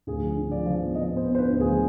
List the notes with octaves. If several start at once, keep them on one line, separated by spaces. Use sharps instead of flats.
D2 G#4
F3
D3
F3 D5
F3
B3
F3 D#5
B3
C5
B3
C5
D3 B4
D2
G#4
F3